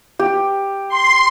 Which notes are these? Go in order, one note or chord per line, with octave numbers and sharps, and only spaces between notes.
G4
C6